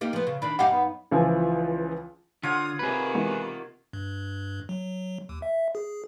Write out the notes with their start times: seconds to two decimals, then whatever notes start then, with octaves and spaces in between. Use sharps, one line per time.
0.01 A#3 D#4 G4
0.13 F3 B3
0.27 C#3
0.42 D#3 D4 B5
0.59 F#2 D#4 G4 F5 F#5
0.72 B3
1.11 C#2 E3 F3 G#5
2.43 D3 F4 C#5 F#5 D#6
2.79 C3 D#3 A#3 G#4 B4
3.15 E3 G#3 B3
3.93 G2
4.69 F#3
5.29 D#2
5.42 E5
5.75 G#4